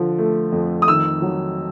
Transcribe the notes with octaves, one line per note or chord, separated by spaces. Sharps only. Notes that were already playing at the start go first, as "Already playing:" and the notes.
Already playing: D3 F3
A3
F2
D#6
D#3 E6
F#3